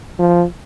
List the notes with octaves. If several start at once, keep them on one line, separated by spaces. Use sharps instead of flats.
F3